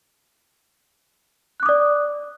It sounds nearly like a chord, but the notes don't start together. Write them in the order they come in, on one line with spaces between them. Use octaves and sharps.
F#6 D6 D#6 D5